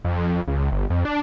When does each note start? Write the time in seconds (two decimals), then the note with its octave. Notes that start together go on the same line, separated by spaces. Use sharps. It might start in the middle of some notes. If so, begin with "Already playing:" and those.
0.05 F2
0.48 C#2
0.72 G1
0.90 F2
1.05 D4